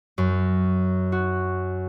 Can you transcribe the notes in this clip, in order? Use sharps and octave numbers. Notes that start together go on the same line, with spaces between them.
F#2
F#4